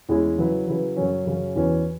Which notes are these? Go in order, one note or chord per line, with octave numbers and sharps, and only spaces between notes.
E2 E3 G#3 C#4 E4
C#3 F#3 E4 B4
C#3 F#3 E4 B4
F#2 C#3 F#3 C#4
F#2 C#3 F#3 C#4
E2 E3 C#4 F#4 B4